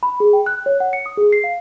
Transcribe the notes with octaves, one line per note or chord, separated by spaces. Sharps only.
B5
G#4
G5
F#6
C#5
F#5
C#7
D#6
G#4
C7
F5